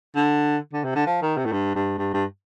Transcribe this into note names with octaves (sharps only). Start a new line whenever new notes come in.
D3
D3
C3
D3
F3
D#3
C3
A2
G2
G2
G2
G2